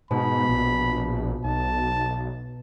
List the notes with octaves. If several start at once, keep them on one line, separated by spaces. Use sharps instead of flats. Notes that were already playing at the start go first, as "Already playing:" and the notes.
G#2 B2 B5
A#1
B1 A5